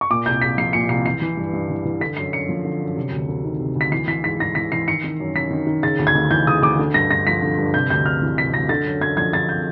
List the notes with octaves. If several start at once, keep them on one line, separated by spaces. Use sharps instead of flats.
C#6
A#2 D6
C2 G6
C2 B6
F3 C7
A#2 C#7
C2 C7
E3 C7
E3
G2
G2
E3
E3
D3 B6
F#2 C7
F#2 C#7
F3
D3
F#2
C3
D2
D2
D#3
C3
D2
B6
E3 C7
E3 B6
G#2 B6
G#2 A#6
E3 B6
E3 C7
D#3 C#7
D#3
F#2
F#2 B6
D#3
D#3
C#3 A6
D2
G#6
D2
E3 G6
C#3 D#6
D2 D6
D3
G2 A#6
G2 A#6
F3 B6
D3
G2
C3 G6
D2 G6
D2 F6
E3
C3 B6
D2 A#6
D3 A6
F#2
F#2 G#6
F3 G#6
D3 A6
G6